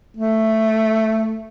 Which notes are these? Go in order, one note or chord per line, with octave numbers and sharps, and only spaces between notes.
A3